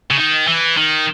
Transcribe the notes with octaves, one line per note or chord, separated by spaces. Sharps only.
C#3
D#3
E3
D#3